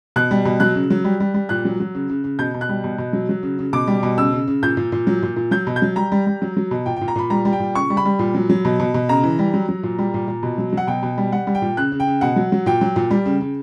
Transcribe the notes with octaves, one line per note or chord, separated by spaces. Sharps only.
B2 F#6
G3
B2
F#3 F#6
C#3
F#3
G3
G3
G3
A#2 F#6
F#3
F#3
C#3
C#3
C#3
B2 G6
B2
F#6
G3
B2
B2
F#3
F#3
C#3
C#3
B2 D6
G3
B2
C#3 E6
C#3
C#3
A#2 G6
A#2
A#2
F#3
A#2
A#2
F#3 G6
B2
G6
F#3
G3 A#5
G3
G3
F#3
F#3
B2
A#2 G5
A#2 G5
A#5
A#2 B5
G3 A#5
G3
G5
A#2
C#3 C#6
G3
B5
G3
A#2
F#3
F#3
B2
B2
B2
C#3 A#5
E3
G3
F#3
F#3
A#2
G3
A#2
A#2
B2
F#3
F#3 F#5
B2 G5
B2
G3
G3 F#5
G3
G5
A#2
C#3 F#6
C#3
G5
C#3
B2 F#5
F#3
F#3
A#2 G5
F#3
A#2
G3
C#3
C#3